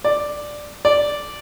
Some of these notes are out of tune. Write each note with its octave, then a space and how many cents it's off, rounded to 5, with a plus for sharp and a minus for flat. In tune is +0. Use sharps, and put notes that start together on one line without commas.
D5 +5
D5 -5